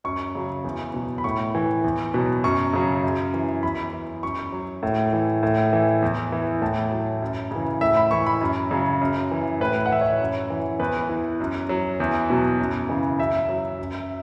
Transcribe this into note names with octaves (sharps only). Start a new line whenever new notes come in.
F#2 C#6
C#3 F#3
E2
B2 F#3
B5
A2 C#6
E3
E2
B2 F#3
F#2 C#6
C#3 F#3
F#2
E3
E2 B5
E3
F#2 C#6
F#3
A2
E3
A2
E3
E2
E3
A2 A5
F#3
F#2
C#3 E3
A2 E5
B5
E3 C#6
B5
F#2
C#3 F#3
F#2
E3
A2 B4
F#5
E3 E5
C#5
F#2
E3
E2 B4
E3
F#2
F#3
E2
B2 F#3
F#2
C#3 E3
F#2 E5
F#3
F#2